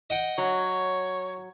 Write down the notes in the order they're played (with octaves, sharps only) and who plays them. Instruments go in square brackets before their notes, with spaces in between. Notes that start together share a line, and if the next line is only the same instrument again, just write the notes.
[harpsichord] D#5 F#5 G5
[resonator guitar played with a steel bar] F#3 [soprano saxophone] C#5